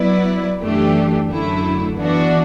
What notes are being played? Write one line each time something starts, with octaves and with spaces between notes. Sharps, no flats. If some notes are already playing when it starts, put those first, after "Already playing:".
Already playing: F#3 B3 E4 B4 D5
F#2 E3 A3 D4 G4
F#2 D3 A3 E4
E3 B3 D4 F#4